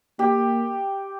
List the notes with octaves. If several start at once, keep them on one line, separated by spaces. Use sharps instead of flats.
A#3 G4